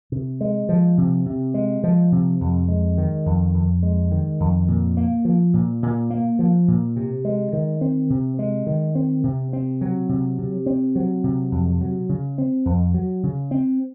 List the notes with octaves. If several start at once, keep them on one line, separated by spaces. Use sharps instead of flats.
C3
G#3
F3
C3
C3
G#3
F3
C3
F2
G#3
D#3
F2
F2
G#3
D#3
F2
A#2
A#3
F3
A#2
A#2
A#3
F3
A#2
C3
G#3
D#3
C4
C3
G#3
D#3
C4
C3
C4
F#3
C3
C3
C4
F#3
C3
F2
F#3
C#3
C4
F2
F#3
C#3
C4